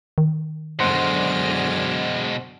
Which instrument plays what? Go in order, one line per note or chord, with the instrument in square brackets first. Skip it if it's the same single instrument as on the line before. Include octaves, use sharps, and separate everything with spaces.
[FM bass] D#3
[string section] F#2 D3 F6 [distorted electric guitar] B2 G#3 [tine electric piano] C5 F#5 C6